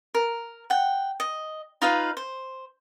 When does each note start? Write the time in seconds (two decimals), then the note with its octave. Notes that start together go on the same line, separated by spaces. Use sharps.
0.15 A#4
0.70 F#5 G5
1.20 D#5
1.82 D#4 F4 B4 F5
2.17 C5